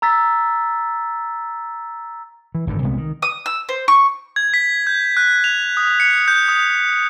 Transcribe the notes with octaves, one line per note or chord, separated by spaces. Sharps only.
A#5 E6 A6 B6
E3
G#1 G2 D3
C2 C3 G#3 B3
D#3
D#6
E6
C5
C#6
G#6
B6
G6
F#6
F7
D#6
C#7
G6
D#6